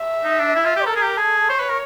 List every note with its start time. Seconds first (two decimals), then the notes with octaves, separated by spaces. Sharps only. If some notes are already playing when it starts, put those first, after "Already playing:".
Already playing: E5
0.24 D#4
0.40 D4
0.56 E4
0.65 F4
0.76 G4
0.86 A4 A#4
0.95 G#4
1.02 G4
1.17 G#4 A4
1.49 C5 C#5
1.60 B4
1.69 A#4